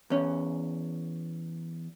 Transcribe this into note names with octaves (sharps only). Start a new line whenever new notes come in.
E2 C#4